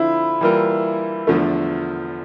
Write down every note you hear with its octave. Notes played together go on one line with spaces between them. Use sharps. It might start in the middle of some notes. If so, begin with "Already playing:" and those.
Already playing: D3 F3 C4 E4 F4
E3 G3 A#3 F4 A#4
E2 D3 F3 A3